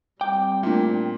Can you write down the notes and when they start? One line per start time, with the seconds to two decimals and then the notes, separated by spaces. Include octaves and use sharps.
0.21 G3 C4 G5 D6
0.63 A#2 A3 D4